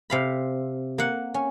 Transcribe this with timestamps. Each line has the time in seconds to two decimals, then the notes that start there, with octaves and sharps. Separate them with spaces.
0.10 C3 F5 B5
0.98 A#3 F#5
1.34 C#4